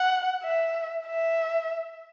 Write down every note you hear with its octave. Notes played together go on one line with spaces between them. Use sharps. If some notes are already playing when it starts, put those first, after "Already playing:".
Already playing: F#5
E5
E5